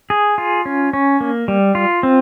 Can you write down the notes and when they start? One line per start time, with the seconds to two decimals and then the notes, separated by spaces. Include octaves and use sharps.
0.10 G#4
0.38 F4
0.66 C#4
0.93 C#4
1.21 A#3
1.48 G3
1.75 F4
2.03 C4